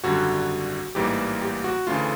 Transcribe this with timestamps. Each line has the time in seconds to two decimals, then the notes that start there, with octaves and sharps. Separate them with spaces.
0.04 G#1 F#2 D3 G3 F#4
0.95 A1 G#2 E3 G3 A#3 G4
1.41 G4
1.64 F#4
1.87 D2 C#3 E3 A3 F4